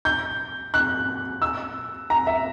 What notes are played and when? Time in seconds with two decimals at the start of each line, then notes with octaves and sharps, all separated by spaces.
0.05 G6
0.74 F#6
1.42 E6
2.10 A#5
2.27 E5